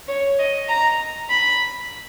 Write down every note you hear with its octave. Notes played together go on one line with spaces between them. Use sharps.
C#5
D#5
A#5
B5